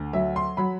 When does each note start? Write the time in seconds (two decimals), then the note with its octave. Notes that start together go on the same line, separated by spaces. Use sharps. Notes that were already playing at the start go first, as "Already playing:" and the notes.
Already playing: D2
0.13 F#3 E5
0.36 C6
0.57 F#3 B5